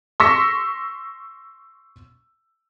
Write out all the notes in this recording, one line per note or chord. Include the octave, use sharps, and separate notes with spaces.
C6 C#6 E6 A#6 B6 C#7